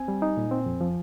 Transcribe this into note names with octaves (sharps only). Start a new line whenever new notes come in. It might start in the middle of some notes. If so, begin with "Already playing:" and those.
Already playing: C4 G#5
G3
D#4
A#2
C4
F2
F3